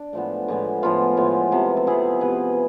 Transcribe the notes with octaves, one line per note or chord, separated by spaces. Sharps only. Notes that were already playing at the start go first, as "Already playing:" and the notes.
Already playing: D4
A2 F3 G#3 B3
A2 F3 G#3 B3
A2 F3 G#3 B3 F4
A2 F3 G#3 B3
C3 F3 B3
A4
C3 F3 B3 E4 G#4
C3 F3 B3 G#4 B4